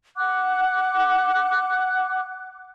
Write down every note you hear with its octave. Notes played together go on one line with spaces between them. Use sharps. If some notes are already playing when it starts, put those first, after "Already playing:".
F#5 D6 F#6